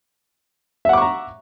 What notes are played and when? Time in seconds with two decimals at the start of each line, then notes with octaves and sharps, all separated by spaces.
0.85 E5
0.89 F#5
0.93 D6
0.97 C#6
1.02 A#5